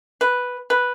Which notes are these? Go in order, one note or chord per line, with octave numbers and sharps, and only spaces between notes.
B4
B4